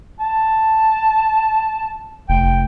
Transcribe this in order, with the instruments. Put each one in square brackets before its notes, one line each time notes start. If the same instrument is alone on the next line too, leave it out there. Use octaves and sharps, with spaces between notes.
[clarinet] A5
[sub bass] F1 [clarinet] G5